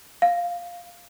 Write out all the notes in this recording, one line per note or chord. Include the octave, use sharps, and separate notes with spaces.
F5